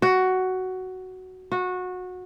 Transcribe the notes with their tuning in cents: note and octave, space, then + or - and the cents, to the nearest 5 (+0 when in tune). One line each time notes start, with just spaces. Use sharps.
F#4 +10
F#4 -20